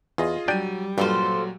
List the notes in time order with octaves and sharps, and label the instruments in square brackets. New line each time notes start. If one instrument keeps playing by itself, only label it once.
[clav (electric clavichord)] E2 [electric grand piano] F4 G#4 D#5
[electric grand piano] F#3 D#7 [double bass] G3 [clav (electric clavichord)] D4 D5 G5
[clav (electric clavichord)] G2 [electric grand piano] A#2 F#3 [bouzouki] F4 A4 C5